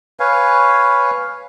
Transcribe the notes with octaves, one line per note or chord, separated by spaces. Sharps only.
B4 C#5 F5 G#5